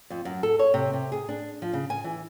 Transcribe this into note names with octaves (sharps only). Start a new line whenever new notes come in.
F2
F#2
A4
C#5
C3
C3
G#4
D4
F3
C#3
G#5
E3